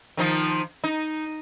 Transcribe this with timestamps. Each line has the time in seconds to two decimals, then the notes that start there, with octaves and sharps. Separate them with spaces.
0.17 D#3 F3 D#4
0.84 D#4